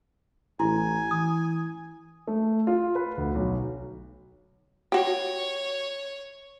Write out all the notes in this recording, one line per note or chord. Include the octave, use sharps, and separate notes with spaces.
A1 E4 G#5
E3 D#6
A3
F4
B4
D2
B1
F#4 G4 C#5